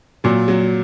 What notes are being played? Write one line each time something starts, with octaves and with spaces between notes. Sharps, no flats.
A#2 F#3
F#3